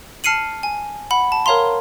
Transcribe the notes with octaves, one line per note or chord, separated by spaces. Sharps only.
A5 F6 C7 C#7 D#7 F#7
G#5
F#5 B5
A5
A#4 C#5 F5 A#5 C6